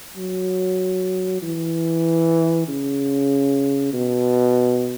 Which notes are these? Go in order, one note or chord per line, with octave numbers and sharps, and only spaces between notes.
F#3
E3
C#3
B2